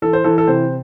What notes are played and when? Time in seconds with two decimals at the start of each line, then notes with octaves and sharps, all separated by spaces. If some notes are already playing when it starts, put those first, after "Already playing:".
0.02 E3 A4
0.13 C5
0.24 E3 A4
0.38 A4
0.47 C3 C5